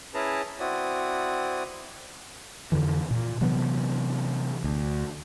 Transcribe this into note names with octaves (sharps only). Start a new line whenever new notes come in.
C#4 E4 G#4 B4 A5 A#5
C4 E4 F#4 D5 D#6
F2 D3 E3
A#2
C3 E3 F#3 B3
D2